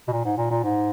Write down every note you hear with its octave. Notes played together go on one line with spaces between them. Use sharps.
B2
A#2
G#2
A#2
A#2
G#2